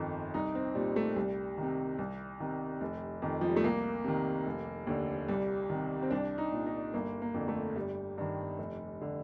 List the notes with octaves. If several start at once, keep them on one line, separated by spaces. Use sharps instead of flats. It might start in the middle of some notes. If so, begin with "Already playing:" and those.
Already playing: G1 F2 D#3
C2 D#4
C4
A#2 G3
A3
C2 G3
D#3
C3
C2
C3 D#3
F1
F2 D#3
F3
G3
A3
C2 A#3
C3 D#3
F1
D#2 D3
C2 G3
C3 D#3
C4
C2 D4
D#4
A#2
D#4
G1 A#3
A#3
F2 D3
A3
G1 G3
G2 D#3
F1
D3